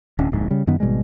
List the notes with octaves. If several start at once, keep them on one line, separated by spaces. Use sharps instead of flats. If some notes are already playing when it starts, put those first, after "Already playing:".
D1 C#4
D1 A#1 G#2
C#3 G3
F#2 D#3 B3
G#1 B2 G3 G#3